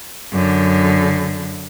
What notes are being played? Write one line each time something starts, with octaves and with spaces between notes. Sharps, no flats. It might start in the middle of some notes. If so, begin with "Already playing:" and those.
F#2 D3